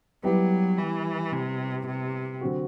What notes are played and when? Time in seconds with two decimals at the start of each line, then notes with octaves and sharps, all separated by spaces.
0.23 F#3 G3 B3 E4 G4
0.78 E3
1.32 C3
1.87 C3
2.41 D3 F#3 C4 F#4